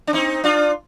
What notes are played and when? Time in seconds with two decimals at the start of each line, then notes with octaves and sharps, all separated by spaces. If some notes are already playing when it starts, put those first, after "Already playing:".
0.07 D4
0.13 C4 D#4
0.44 D4 F4